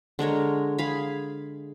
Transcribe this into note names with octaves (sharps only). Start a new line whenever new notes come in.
D3 G#3 A#4 C#5
G#4 F5 B5